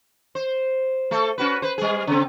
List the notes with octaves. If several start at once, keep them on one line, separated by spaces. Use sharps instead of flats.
C5
A3 A4
C#4 F#4 B4
B4 C5
G3 G#4
C#3 C4